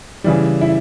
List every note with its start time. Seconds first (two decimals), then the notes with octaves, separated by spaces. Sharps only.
0.24 C#3 E3 G3
0.61 E4